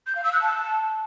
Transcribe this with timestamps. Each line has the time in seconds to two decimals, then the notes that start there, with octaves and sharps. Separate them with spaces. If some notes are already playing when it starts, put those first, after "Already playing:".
0.07 G6
0.15 F5
0.24 E6
0.33 F#6
0.41 A5